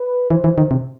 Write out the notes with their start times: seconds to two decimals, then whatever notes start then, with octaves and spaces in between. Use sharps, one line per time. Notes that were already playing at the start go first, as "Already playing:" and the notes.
Already playing: B4
0.30 E3 C5
0.44 E3
0.58 D#3
0.71 C3